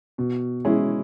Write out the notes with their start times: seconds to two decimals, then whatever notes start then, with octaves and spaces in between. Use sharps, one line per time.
0.18 B2
0.65 G#3 C#4 E4 G#4